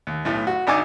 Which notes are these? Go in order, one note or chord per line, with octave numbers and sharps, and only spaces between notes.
D#2
B1 A2
F#4
G#1 D4 D#4 G#5 D6